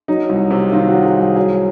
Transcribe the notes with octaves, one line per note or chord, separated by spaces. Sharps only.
F#3 D#4
C2
C3
D#3 F4
F#4
F#3
G#4
C2
G#4
F#3 G#4